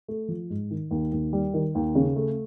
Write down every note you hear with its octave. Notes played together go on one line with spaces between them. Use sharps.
A3
F3
G#2
D#3
D#2
D#2
G3
D#3
D#2
C#3
A3